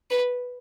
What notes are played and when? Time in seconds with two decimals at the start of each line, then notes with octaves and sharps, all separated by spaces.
0.11 B4